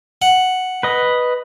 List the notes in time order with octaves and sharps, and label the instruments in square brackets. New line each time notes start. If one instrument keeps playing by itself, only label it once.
[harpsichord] F#5
[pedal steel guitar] B4 D#5